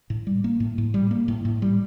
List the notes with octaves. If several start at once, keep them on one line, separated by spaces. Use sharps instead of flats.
A2
G3
A#3
A2
A2
G3
A#3
A2
A2
G3